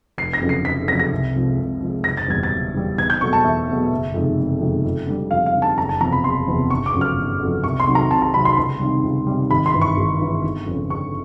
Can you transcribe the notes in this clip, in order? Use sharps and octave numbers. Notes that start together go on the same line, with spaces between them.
F1 C7
A#6
F2 C#3 F#3
C7
F1 B6
F2 C#3 F#3 A#6
A#6
C2
C3 F3 G#3
C2
C3 F3 G#3
F#1 A#6
A6
E2 B2 G3 G#6
A6
F#1
E2 B2 G3
E2 G#6
G6
B2 F#3 A3 C#6
A5
E2 E5
B2 F#3 A3
F#1
F2 C3 D#3 G#3
F#1
F2 C3 D#3 G#3
F2
D3 G3
F2 F5
F5
D3 G3
A5
F#1 A#5
A5
E2 C3 F3 A#5
B5
F#1 C6
E2 C3 F3
G1 C#6
D6
F2 C#3 F#3
F6
G1
F2 C#3 F#3
C2 C#6
C6
C3 D#3 F#3
A#5
C2 A5
A#5
C3 D#3 F#3 B5
C6
C#2 C6
C3 D#3 G3
C#2
C3 D#3 G3
G#1 B5
C6
G2 E3
C#6
G#1
G2 E3
G1
F2 C#3
G1 C#6